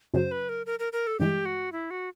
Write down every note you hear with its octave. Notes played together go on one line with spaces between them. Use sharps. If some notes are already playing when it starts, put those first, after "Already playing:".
F#2 C#3 F#3 C5
B4
A#4
A#4
A#4
A#4
A4
G2 E3 G#3 G4
F#4
E4
F#4